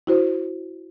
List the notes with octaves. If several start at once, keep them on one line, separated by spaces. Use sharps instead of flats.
E4 F#4 C5